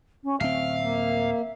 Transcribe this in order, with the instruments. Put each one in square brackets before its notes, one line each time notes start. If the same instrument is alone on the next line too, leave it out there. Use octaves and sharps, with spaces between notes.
[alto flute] C#4
[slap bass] D1 C4 [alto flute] E5 [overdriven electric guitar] F5
[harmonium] A#3